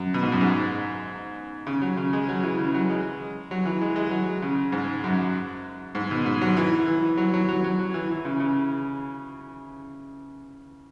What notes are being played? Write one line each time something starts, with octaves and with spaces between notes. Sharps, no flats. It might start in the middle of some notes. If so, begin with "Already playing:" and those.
Already playing: F#2
B2
G#2
F#2
G#2
C#3
F#3
C#3
G#3
F#3
E3
C#3
F#3
G#3
F#3
E3
G#3
G#3
F#3
C#3
G#2
F#2
G#2
B2
G#2
F#3
E3
E3
F#3
F#3
F#3
F#3
F#3
E3
E3
C#3
C#3